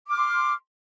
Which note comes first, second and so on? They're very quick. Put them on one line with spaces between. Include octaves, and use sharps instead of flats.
D6 F6 C6